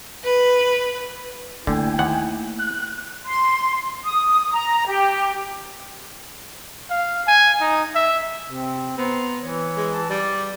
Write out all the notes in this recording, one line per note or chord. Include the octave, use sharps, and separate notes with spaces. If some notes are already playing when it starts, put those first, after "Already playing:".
B4
D3 A3 A#3 E4 G5 G#5
D#2 F#5
F#6
C6
D#6
A#5
G4
F5
G#5
D#4
E5
C3 C4
B3 C5 A#5
E3 C#5
G#3
A5
G3 D5